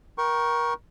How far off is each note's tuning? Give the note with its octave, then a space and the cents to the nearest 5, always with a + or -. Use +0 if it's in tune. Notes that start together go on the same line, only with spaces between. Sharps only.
A#4 +25 G5 -25 C#6 -10